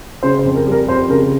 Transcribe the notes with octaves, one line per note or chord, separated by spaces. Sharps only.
C#3 C5
C5
F2
A#4
G3
A#4
F2 C5
C#3 A#4